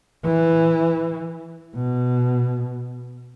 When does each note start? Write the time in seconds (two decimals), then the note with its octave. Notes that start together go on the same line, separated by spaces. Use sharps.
0.24 E3
1.75 B2